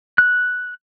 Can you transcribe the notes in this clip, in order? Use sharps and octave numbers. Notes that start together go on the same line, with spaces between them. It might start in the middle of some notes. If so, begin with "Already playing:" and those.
F#6